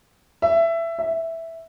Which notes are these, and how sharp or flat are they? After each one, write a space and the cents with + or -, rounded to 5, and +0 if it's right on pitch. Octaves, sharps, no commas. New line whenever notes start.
E5 +15
E5 -5